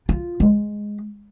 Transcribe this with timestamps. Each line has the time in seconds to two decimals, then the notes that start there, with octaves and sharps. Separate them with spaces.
0.09 F4
0.40 G#3